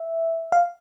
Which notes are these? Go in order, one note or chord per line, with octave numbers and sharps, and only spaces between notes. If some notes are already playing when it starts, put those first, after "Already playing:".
Already playing: E5
F5